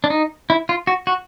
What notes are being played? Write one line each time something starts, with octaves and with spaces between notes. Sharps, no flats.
D4
D#4
E4
F4
F#4
F#4